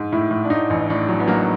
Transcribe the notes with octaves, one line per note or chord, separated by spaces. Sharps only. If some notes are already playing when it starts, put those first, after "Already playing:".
Already playing: G#2
A2 E4
A2
D4
A2 D#4
A1
A2 D4
F#3
B3
F#3 A#3